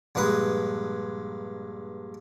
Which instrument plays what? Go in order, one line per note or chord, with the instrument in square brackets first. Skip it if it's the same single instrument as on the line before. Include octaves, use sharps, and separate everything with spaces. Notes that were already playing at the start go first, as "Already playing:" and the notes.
[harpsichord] A#1 G2 G#3 B4 D#6